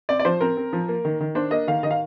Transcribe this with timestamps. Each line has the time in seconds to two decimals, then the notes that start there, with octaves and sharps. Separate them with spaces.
0.09 C4 D5
0.19 D5
0.25 F3 C5
0.41 C4 A#4
0.57 C4
0.73 F3
0.88 A#3
1.05 D#3
1.20 D#3
1.35 D4 C5
1.51 A#3 D#5
1.67 D#3 F5
1.83 D#3 D#5
1.91 F5